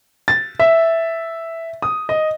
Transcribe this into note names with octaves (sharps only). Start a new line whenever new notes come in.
A6
E5
D#6
D#5